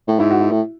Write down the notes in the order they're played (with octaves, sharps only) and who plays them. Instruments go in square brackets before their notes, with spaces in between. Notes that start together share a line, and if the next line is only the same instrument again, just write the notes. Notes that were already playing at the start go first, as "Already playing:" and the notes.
[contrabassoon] A2
[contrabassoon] G#2 [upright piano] E4
[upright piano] F#4
E4
[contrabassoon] A2